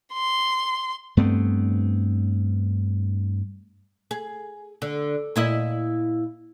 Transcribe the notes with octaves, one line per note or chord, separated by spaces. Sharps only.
C6
G2 A3 B3 C4
G#4
D3
A#2 E4 D#5